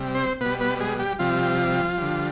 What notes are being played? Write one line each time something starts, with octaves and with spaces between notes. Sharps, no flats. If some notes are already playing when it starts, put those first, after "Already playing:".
Already playing: C3 G3
C4 C5
B2 G3 B3 B4
B3 B4
G#3 G#4
G3 G4
C3 F3 G3 F4
D3 G3